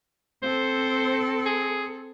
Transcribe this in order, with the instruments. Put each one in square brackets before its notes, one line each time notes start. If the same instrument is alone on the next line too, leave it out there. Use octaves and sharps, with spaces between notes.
[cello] C4 A4 [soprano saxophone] C5
[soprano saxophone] G#4